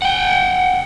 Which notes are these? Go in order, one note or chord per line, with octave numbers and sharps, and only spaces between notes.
F#5 G5